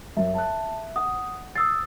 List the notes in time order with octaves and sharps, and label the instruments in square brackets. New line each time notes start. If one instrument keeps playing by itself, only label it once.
[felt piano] F#2 [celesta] E5
[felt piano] A5 F#6
[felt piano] F#5 [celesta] D#6
[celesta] D#6 E6 A6 [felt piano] C7